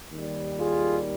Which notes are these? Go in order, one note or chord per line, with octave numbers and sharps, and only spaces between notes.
D#2 D#3 G3
F4 G#4